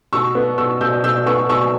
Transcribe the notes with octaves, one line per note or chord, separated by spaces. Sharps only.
B2 C#6 E6
B3
B2 C#6 E6
B2 E6 G6
B2 E6 G6
B3 C#6 E6
B2 C#6 E6